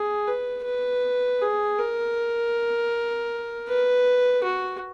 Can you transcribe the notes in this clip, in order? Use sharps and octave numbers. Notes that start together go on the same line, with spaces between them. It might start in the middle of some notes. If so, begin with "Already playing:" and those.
Already playing: G#4
B4
B4
G#4
A#4
B4
F#4